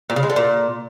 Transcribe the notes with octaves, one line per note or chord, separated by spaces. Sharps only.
A#2
C#3
G#3
D3
A#2